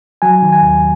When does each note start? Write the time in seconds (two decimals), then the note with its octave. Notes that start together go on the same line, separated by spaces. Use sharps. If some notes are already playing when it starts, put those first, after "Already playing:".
0.22 F#3 G#5
0.42 D#3
0.52 G#5
0.62 D#2